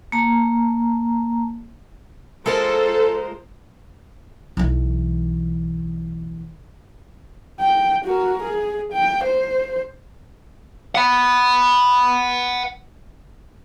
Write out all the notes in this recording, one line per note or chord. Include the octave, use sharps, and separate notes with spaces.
A#3 A5 A#5
G#3 F4 A4 A#4 C5
B1 E3
G5
F#4 A#4
G#4
G5
C5
F#5 B5